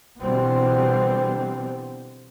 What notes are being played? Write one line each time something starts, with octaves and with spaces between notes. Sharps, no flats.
B2 D3 E3 G3 B3 C4